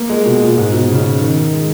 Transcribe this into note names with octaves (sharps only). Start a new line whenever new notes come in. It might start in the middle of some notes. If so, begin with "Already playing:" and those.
Already playing: A#3
G#3
B2
A#2
G#2
B2
C#3
D#3
G#3